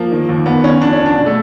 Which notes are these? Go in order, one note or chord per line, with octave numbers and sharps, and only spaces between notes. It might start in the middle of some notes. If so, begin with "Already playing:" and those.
Already playing: F3 A#3
D#3
D#2
D#2 B3
D#3 C#4
F2 D4
C#4
D3
D4
B2
A3